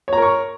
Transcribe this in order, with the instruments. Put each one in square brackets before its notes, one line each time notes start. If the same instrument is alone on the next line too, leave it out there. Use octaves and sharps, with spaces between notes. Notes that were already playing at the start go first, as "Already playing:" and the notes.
[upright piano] C#5
A#5
A#4
C#6